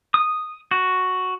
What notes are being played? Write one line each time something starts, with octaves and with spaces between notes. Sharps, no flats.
D#6
F#4